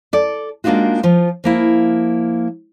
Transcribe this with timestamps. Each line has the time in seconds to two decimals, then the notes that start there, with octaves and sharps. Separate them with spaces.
0.13 A4 D5
0.64 G#3 A#3 D4 D#4 F4 F#4
1.03 F3 F4
1.44 F3 A#3 E4